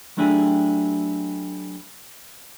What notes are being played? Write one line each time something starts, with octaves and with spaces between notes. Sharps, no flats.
F#3 A3 D4 E4 G4 G#4